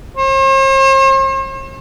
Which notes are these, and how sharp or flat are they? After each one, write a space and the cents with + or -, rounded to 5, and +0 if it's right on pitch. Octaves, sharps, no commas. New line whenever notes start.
C5 +45